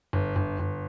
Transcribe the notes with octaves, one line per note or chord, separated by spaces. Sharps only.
G1
G1
G1